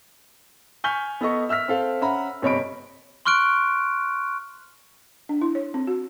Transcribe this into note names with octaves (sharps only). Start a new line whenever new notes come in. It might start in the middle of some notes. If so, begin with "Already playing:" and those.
G#5 C#6 F6 G6 B6 G7
B3 A4 D#5 C#6
E5 E6 F6 B6
C4 A4 F5
C#4 E5 F#5 A#5 B5
G1 C3 C#5 D#5 B5 D7
C6 C#6 F6 F#6 D7
D4
E4
C#5
C4
F#4